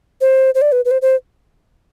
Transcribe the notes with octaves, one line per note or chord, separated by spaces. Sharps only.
C5
C5
D5
B4
B4
C5
C5